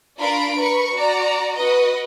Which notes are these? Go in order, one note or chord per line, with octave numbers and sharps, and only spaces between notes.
D4 F4 A#4 B5 C6 D7
A#4 B4 B5 C#6
F#4 D5 A#5
F#4 B4 D#5